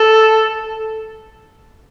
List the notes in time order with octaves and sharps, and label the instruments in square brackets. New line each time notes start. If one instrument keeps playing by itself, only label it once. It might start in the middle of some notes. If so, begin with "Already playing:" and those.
Already playing: [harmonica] A4